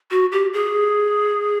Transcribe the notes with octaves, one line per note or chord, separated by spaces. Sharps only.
F#4
G4
G#4